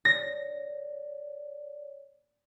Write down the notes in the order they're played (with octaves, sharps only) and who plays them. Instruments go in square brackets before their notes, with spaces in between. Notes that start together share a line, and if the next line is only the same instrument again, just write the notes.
[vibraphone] C#5 D5 [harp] A#6